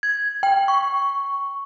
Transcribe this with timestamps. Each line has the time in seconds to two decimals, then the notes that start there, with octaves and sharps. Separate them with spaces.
0.03 G#6
0.43 G5
0.68 C#6